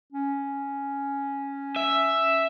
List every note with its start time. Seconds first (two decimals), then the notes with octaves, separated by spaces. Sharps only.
0.13 C#4
1.76 E5